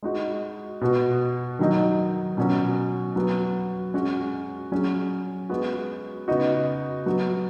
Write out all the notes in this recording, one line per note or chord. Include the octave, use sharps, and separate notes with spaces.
G#3 D#4 F#4
B2 B3 F#4
D#3 F#3 D#4
B2 F#3 C#4 F#4
F#3 B3 F#4
G#3 C#4 F#4
F#3 C#4 G#4
G#3 B3 F#4
C#3 B3 D#4 F#4
F#3 B3 F#4